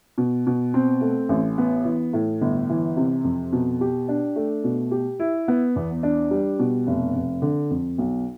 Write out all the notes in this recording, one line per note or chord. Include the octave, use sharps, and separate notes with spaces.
B2
B2
C4
A3
A1
B3
E3
A2
G1
E3
C3
F2
B2
G4
D4
A3
B2
G4
E4
B3
E2
D4
G3
B2
F1
F1
D3
F2
B1